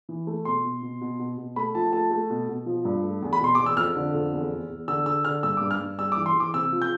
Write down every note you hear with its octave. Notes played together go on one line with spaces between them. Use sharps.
E3
A3
B2 C6
B2
B2
B2
B2
B2
A3 B5
F3 A5
A3 A5
A3
B2
B2
F3
G2
A3
E2
B5
B2 C6
E2 D6
E6
F2 F6
D3
F2
E2
E2
E2
D3 E6
D3 E6
D3 F6
G2 E6
G2 D6
F6
G2
G3 E6
D6
E3
C6
E3 D6
C3 E6
F3
G6